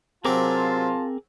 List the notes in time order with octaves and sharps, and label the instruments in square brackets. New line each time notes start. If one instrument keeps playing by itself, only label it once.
[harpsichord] C3 F#3 [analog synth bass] C4 [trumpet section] F4 A5 [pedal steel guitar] G#4 A#4 D6